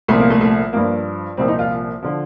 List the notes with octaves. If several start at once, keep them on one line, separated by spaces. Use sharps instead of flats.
C2 A#2 F3 A3
A#3
A3
A3
G2 F3 A#3
C2 A#2 F3 C4
D#4
F4
D3 F3